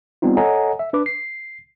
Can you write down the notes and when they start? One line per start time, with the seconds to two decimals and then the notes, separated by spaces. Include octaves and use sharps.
0.22 G3 B3 C4 D#4 F4
0.37 A4 C#5 D#5 F#5 G#5 A#5
0.79 E5
0.93 D4 B4 D6
1.06 C7